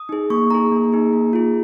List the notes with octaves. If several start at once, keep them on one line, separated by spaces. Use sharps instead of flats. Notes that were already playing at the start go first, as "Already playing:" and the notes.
Already playing: D#6
D#4 G#4
A#3 C#6
D#4 G#4 A#5
A#3
D#4 G#4
A#3
F4 G#4